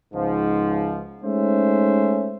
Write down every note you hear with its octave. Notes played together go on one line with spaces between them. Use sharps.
C#2 G#2 F3
G#3 A3 C#4 D#4 C5 E5